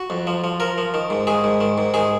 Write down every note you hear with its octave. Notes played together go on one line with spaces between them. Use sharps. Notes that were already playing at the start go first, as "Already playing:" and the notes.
Already playing: F#4
F2
F3
F3
F3 A#4
F3
D#3
G#2
D#3 G#4
G#2
D#3
G#2
D#3 G#4